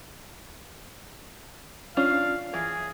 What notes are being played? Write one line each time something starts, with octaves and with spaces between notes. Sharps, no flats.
C#4 D4 F4 F5
E3 G#4